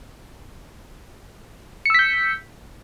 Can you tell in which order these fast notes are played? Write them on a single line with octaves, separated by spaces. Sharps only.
C#7 E6 B6 G6